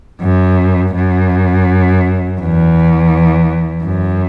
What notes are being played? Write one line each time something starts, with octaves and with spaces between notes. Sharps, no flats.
F#2
F#2
E2
F#2